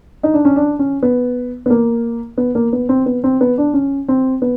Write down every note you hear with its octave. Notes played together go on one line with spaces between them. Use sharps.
D#4
D4
C#4
D4
C#4
B3
B3
A#3
B3
A#3
B3
C4
B3
C4
B3
D4
C#4
C4
B3